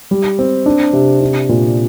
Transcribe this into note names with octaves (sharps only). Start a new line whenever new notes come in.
G3
C4
D4
C3
D4
A#2